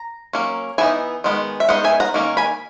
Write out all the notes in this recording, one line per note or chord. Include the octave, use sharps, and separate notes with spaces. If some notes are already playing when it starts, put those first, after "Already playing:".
Already playing: A#5
F#3 A#3 C#4
E3 B3 D#4 E5 G#5
D#3 G#3 B3
E5
G#3 B3 D#4 D#5 F#5
E5 G#5
F#5 A#5
D#3 A#3 C#4
G#5 B5